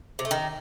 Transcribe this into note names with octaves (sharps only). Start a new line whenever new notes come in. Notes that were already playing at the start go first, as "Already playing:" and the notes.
C3
A3
D#3